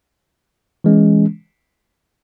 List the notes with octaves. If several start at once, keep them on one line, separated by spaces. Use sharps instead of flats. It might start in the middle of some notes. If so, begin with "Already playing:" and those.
E3 G#3 C#4